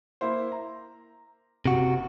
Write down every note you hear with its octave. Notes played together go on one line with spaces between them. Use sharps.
A#3 E4 C5
A#5
F#1 C3 F#4